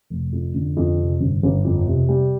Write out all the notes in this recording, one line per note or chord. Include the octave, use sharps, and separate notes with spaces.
F1
F2
D3
F2
C3
G1
G1
F2
C3
G3